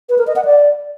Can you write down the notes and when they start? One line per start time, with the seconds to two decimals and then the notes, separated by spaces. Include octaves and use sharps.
0.09 B4
0.18 A#4
0.27 D#5
0.36 F#5
0.45 D5